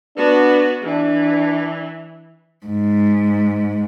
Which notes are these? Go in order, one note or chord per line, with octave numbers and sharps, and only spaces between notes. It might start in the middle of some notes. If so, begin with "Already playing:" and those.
B3 D4 F#4 B4
E3 D4
G#2